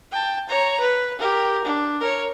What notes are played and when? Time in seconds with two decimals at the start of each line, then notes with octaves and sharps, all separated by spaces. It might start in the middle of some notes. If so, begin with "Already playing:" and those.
0.12 G5 A5
0.49 C#5 A#5
0.80 B4
1.19 G4 A#4
1.65 D4
2.00 A#4 C#5